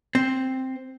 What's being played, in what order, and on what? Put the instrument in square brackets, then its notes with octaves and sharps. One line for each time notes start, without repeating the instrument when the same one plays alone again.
[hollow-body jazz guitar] C4